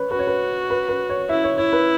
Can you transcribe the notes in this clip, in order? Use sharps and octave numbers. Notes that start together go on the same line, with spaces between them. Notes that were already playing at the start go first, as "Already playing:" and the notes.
Already playing: B4 C#5
F#4 B4
C#5
B4
B4
B4
C#5
E4 E5
C#5
E4 C#5
B4